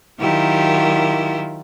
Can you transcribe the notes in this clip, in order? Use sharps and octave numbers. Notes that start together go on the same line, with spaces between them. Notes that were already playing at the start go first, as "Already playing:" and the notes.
D#3 F#3 E4 F4 G4 A#4